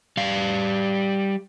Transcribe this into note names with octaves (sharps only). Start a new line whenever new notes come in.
G3 F5